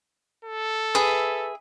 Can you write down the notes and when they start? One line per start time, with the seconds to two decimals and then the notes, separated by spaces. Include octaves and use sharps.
0.45 A4
0.95 G#4 B4 E5